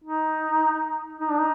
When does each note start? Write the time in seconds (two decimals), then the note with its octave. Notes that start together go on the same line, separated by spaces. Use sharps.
0.04 D#4
1.20 D#4
1.30 D4
1.38 D#4